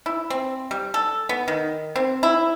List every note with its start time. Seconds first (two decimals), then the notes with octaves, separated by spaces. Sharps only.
0.06 E4
0.30 C4
0.71 G3
0.94 A4
1.29 B3
1.48 D#3
1.96 C4
2.23 E4